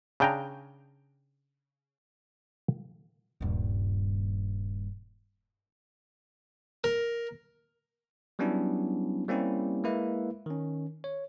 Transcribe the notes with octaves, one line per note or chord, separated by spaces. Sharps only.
C#3 D4 G5 G#5 A#5
D#1 G2
A#4
F#3 G3 B3 C#4 D4 E4
G3 A#3 C4 C#4 E4 G4
G#3 A#3 E4 B4 E5
D#3 C#4
C#5